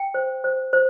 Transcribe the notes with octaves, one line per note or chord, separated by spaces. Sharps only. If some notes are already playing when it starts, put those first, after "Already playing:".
Already playing: G5
C5
C5
C5